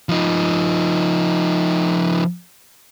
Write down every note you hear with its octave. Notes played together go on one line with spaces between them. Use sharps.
F3 D#4